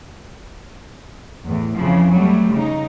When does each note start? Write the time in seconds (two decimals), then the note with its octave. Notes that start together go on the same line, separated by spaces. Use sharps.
1.46 E2 A2
1.76 F2 C#3 E3 F3
2.12 F#3 G3 A3
2.52 C#3 D#4